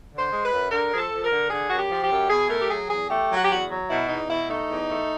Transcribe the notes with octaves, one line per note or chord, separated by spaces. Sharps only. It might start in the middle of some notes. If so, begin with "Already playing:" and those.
D3
C5
G#3
B4
F#2
D3 A#4
F3 G#4
A4
F3
A#4
D3
D3 G#4
F#2 F#4
G4
F3
G4
F#2
B2 G#4
A3 A#4
G4
F#3 G#4
E2 G#4
A3 G4
F#3
F#4
G4
E2 F#4
F#3
B2 E4
E2 D#4
B2 E4
A3 D#4
E2
A3